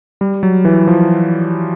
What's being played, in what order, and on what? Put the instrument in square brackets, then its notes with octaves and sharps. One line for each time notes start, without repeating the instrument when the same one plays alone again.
[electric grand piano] G3
F#3
E3
F3